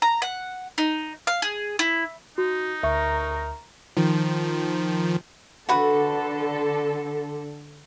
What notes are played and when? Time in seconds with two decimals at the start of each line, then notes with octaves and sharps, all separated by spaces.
0.02 A#5
0.22 F#5
0.78 D#4
1.27 F5
1.42 G#4
1.79 E4
2.38 D#4 F#4
2.83 D2 A#4 E5 C#6
3.97 D#3 F3
5.69 D3 F#4 A4 B4